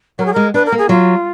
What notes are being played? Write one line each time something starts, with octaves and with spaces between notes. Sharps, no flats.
F#3 A#4
G#4
G#3 A#4
D4 B4
A#4
A#3
G#4
F#3 F4